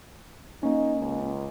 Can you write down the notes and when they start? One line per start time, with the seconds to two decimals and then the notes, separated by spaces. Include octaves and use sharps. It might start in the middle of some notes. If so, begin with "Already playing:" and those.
0.63 A#3 C#4 D#4
1.00 C#2